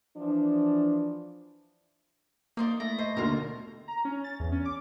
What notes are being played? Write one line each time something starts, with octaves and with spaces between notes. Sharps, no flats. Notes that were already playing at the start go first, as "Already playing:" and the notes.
E3 F3 D4
A#3 D#4 C5 D5
A3 E4 A#6
C5 D#5
D#2 B2 D3 F4 A#4
A#5
C#4
A6
E2
C#4
D6